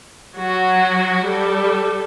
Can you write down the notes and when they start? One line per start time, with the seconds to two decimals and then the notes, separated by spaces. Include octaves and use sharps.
0.37 F#3 F#4
1.25 G3 A4